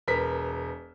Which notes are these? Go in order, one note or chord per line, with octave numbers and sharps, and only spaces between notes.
E1 A#4 B4 B6